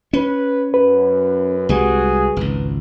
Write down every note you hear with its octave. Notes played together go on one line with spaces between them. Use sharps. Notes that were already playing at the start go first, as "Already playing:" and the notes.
C#4 B4
F#2 B4
C2 G3 G#3 F#4 G#4
G#1 C#2